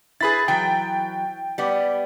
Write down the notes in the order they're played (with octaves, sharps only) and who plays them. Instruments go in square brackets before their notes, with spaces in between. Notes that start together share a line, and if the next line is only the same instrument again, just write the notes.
[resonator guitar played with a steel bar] E4 B4 [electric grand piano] G#4 B5 A6
[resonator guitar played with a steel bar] E3 F#3 [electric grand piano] G5
[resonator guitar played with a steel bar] G3 B3 D5